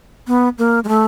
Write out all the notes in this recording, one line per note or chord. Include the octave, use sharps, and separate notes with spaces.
B3
A#3
G#3
A3